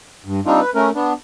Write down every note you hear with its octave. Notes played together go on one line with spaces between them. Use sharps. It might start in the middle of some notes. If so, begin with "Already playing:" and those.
G2
G3 C4 D4 D#4 F4
B4
A3 C#4 A#4
B3 D4